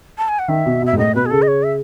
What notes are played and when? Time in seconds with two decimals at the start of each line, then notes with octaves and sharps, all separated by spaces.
0.18 A5
0.29 G#5
0.39 F#5
0.48 D#3 E5
0.66 B2
0.82 B2 E5
0.93 G#2
0.98 A2 D#5
1.15 B2 B4
1.26 G#4
1.31 C#3 A4
1.42 D#5
1.48 C#5
1.63 E5